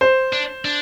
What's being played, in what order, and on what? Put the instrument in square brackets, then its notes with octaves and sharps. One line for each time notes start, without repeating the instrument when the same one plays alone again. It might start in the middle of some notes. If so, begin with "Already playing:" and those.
[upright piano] C5
[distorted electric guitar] D4
D4